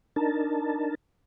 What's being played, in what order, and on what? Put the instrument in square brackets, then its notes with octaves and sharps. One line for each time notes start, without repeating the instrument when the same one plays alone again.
[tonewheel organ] D4 D#4 A#4 A5